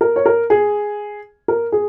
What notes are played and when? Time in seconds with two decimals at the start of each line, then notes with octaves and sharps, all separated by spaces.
0.01 A#4
0.16 C#5
0.26 A#4
0.50 G#4
1.48 A#4
1.72 G#4